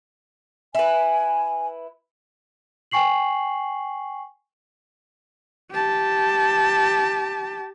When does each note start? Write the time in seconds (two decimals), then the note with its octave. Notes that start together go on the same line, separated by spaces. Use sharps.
0.75 E4 B4 G#5
2.91 G5 G#5 C#6 C7 F#7
5.71 G4 A5